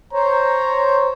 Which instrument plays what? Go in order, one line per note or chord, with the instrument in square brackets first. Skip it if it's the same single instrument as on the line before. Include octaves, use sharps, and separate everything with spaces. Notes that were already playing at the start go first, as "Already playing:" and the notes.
[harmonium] C5 C#5 [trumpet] A#5